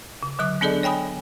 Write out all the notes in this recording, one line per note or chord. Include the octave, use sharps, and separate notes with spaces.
C#3
D3 F#3 D#6 F#6
B3 D4 G#4 A4 D5 D#5
C#5 G5 G#5 B5 D#6